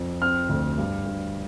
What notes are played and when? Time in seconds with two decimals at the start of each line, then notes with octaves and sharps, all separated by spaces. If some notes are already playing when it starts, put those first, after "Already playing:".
Already playing: F2
0.22 C4 F6
0.49 D2
0.78 G2
1.06 G2